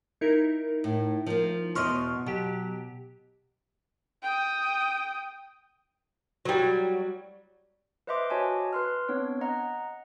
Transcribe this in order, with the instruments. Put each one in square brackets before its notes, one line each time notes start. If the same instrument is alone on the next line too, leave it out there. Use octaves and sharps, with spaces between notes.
[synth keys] D#4 E4 A#4
[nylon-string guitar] A2
F3 A#3
[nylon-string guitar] E2 B2 D#5 [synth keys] C6 C#6 F6
[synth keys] B2 G4 [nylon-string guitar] F#3
[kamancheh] G5 D#6
[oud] F#3 G3
[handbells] B4 C5 D#5 E5 C6 D6
F#4 C#5 D#5 G#5 A5
B4 C6 F6
B3 C4 D4 C#5
D#5 F#5 A#5